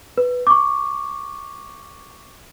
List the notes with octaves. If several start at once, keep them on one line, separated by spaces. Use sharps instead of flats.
B4
C#6 D6